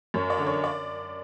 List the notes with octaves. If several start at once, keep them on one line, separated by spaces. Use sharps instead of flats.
F#2 C#5
D5
D3
C#5
D5